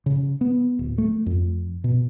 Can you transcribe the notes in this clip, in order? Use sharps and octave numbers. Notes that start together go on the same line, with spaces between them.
C#3
B3
D1
A3
F2
B2